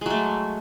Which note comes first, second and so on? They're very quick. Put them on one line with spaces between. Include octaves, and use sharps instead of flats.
G#3 F#3 A3